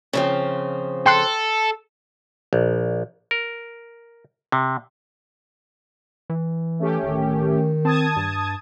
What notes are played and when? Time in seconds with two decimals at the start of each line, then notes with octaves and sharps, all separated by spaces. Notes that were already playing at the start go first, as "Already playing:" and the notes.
0.13 C#3 F3 C4
1.06 A4 G5 C6 F#6
2.53 A#1
3.31 A#4
4.52 C3
6.30 E3
6.79 A3 C#4 G4
7.03 D1 D#3
7.85 C4 A5 D#6 G#6
8.16 G2